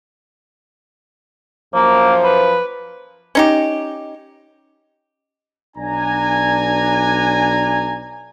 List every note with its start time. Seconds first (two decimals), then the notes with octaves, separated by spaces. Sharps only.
1.74 F#2 F3 A#3 C5
2.24 B4
3.35 C#4 D#4 G4
5.77 B1 D4 G#5 A#5